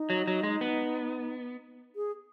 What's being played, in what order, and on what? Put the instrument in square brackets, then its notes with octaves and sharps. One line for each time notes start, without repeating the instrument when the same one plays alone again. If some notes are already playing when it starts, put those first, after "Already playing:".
Already playing: [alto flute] D#4
[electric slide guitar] F#3
F#3
G#3
B3
[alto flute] G#4